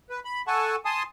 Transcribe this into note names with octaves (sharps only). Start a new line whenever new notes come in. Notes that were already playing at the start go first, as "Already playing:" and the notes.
B4
B5
A4 F#5 G#5 A5 C#6
G#5 A5 C6 D#6